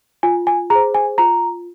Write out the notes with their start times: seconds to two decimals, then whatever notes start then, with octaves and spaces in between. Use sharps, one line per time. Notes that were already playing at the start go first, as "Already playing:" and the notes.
0.23 F4 G#5
0.47 G#5
0.70 G#4 C5 A#5
0.95 G#5
1.18 F4 A#5